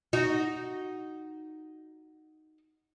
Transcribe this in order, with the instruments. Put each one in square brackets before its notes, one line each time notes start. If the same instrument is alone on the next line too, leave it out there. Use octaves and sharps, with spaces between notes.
[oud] D#4 F#4